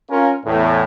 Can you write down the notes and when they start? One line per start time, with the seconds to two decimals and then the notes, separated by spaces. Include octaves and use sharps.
0.10 C#4 F4 A#4
0.45 E2 A2